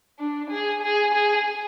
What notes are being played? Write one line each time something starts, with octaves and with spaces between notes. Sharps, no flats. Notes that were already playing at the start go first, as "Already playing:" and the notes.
D4
G#4
G#4
G#4